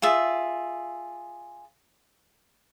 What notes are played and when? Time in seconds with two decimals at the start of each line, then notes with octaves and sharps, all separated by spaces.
0.02 F4 G#4 E5